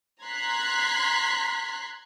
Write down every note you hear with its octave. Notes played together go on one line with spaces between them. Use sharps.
A#5 C6 F#6 G#6 B6